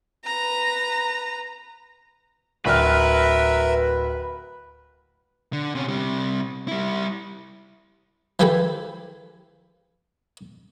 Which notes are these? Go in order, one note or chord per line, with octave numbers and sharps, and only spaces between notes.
B4 A#5
D1 A#4 B4 E5 F6
D3
C3 C#4
C3 G3
G3 E4
E3 F3 G4 A4 G#5 B5